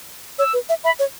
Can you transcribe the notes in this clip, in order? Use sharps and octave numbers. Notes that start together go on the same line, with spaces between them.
C#5 E6
B4
E5
E5 B5
C#5